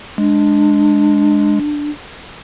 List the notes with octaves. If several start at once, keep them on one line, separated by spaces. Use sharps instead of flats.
G#3 D4